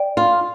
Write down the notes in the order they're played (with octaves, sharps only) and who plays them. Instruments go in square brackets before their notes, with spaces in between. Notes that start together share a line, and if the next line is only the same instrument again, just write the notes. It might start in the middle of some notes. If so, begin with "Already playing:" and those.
Already playing: [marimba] D5 G5
[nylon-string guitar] F4